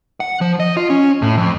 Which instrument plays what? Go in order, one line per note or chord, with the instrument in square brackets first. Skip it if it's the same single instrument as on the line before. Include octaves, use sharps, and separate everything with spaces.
[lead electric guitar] F#5
F3
D#5
F4
C#4
A2
F2